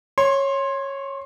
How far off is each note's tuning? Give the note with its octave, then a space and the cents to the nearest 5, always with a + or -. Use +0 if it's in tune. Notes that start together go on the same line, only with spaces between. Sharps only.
C#5 -10 C6 +20